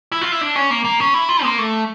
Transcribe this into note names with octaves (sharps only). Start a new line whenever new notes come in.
E4
F4
E4
D4
C#4
A#3
A#3
C#4
E4
F4
A#3
A3